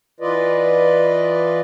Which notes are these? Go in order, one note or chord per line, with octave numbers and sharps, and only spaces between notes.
E3 F4 B4 D5 D#5